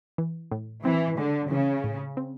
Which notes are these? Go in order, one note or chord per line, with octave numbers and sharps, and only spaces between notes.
E3
A2
E3 C4
D3 G#3
C#3 E3
A2
C4